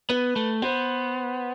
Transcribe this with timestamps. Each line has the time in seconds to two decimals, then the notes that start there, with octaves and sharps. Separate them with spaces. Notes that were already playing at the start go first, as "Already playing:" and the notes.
0.10 B3 B4
0.36 A3
0.62 B3 C5